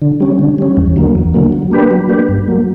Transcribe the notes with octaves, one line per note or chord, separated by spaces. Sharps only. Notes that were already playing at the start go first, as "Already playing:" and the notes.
D3
G3 C#4
D3
G3 C#4
E2
D3 F#3 A#3
E2
D3 F#3 A#3
F#3
A#3 D4 G4 B4
F#3
A#3 D4 G4 B4
G2
F#3 A#3